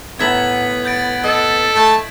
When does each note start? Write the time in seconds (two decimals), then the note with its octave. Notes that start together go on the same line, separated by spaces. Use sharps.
0.19 A2 B3 E5 A#5 G#6 B6 F#7
0.85 G6 A6 D7
1.24 A4 D#5
1.75 A3 A5